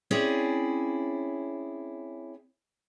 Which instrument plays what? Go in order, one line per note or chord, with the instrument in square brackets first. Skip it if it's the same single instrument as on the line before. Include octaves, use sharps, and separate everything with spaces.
[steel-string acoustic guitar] C4 C#4 E4 G#4 C#5 D5